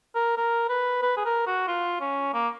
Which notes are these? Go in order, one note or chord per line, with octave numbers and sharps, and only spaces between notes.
A#4
A#4
B4
B4
G#4
A#4
F#4
F4
C#4
A#3